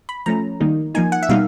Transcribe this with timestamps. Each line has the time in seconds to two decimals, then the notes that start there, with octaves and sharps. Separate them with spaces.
0.09 B5
0.26 F3 A3 C#4 A#5
0.60 D#3 G3 A#3 D#4
0.95 F3 A#3 D#4 G#5
1.12 F#5
1.23 E5
1.29 B2 G3 A#3 D#4 F5